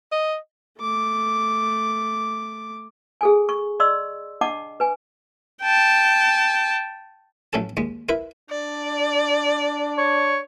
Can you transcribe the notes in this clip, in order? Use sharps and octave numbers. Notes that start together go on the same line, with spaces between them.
D#5
A3 D6
G#4 A4 G#5
C#6
D5 D#5 C6 E6
D4 D#5 F#5 A5 D6
B4 G#5
G5 A5
A1 F#3 C#4 A4 A5
D#2 G#3
E4 A#4 B4
D4 D5
C#5